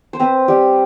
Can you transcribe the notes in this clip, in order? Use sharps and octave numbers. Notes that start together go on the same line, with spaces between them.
C5
C4 B4
G3 G4